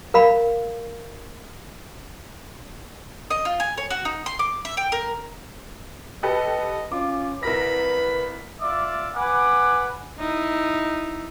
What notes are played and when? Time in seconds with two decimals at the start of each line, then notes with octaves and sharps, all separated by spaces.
0.14 A#4 F5 B5
3.30 D#5
3.45 F4
3.60 G#5
3.78 C#5
3.90 F#4
4.05 D#4
4.26 C6
4.39 D6
4.65 E5
4.77 G5
4.92 A#4
6.23 G4 A4 B4 D#5
6.92 C#4 F4 D6
7.43 C2 A#4 B4 B5 A#6
8.61 F4 D5 E5 D6
9.15 B4 F#5 G#5 D6
10.19 D#4 E4